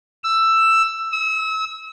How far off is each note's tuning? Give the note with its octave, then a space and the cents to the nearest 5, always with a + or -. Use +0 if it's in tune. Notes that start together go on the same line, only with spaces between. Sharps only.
E6 +10
E6 -35